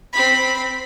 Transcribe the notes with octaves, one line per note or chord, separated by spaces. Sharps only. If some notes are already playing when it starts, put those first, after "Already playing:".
C4 B5